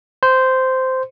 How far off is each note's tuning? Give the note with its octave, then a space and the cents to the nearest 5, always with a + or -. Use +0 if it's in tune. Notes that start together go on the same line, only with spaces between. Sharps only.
C5 -10